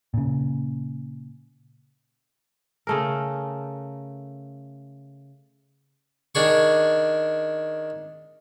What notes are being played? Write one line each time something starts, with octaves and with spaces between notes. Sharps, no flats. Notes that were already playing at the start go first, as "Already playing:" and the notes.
A#2 C#3
C#3 A3 A#4
D#3 D4 G#4 C#6